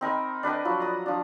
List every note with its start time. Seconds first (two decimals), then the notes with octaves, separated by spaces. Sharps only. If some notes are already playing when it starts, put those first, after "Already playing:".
0.01 C4 D#4 A#4 B5
0.43 D4 B4 D#5 G5
0.65 F3 F#3 B5
0.80 A#5 D#6
1.06 F3 D4